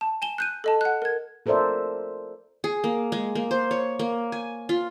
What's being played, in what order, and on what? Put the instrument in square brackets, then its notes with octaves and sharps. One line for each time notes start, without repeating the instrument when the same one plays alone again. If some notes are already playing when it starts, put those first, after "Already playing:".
[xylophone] A5
G#5 E7 G7
F#6 G6 D#7
A4 D#5 A5
F#5 F#6
A#4 G#6
[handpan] F4 A4 A#4 C5 D5 E5
[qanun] G#4
A#3
G#3
A#3
C5
C#5
A#3
G#5
F4